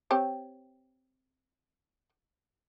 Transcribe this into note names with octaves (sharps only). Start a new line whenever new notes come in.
C4 G4 C#5